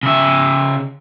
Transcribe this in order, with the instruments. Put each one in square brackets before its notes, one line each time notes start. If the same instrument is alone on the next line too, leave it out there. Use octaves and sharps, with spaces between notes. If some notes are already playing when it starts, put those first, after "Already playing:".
[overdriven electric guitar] C#3 E5